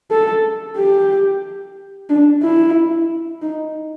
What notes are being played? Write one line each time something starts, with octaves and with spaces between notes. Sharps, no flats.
A4
G4
D4
E4
D#4